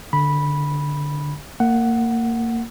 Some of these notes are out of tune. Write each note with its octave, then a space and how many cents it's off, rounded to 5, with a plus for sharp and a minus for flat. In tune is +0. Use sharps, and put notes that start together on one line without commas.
D3 +0 B5 -10
A#3 -25 F#5 +10